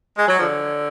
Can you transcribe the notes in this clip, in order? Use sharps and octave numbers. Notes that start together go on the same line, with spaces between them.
G#3
F#3
D3 F3